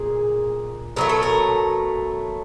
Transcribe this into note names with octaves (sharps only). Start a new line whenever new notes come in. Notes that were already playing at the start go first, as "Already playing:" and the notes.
Already playing: A#2 G#4
B2 F#3 A3 A#4
A4
A#4